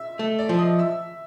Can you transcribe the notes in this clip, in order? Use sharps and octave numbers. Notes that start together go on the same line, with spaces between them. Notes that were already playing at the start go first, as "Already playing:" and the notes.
Already playing: E5 E6
A3
D5 D6
F3
D#5 D#6
E5 E6